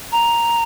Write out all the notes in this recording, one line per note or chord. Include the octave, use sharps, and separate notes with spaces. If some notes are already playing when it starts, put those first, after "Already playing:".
A#5